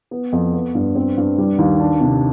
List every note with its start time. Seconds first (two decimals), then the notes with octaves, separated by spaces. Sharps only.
0.11 B3
0.33 F2
0.53 B3
0.75 G2
0.95 C4
1.18 G2
1.38 G3
1.58 D#2
1.80 D4
2.01 C3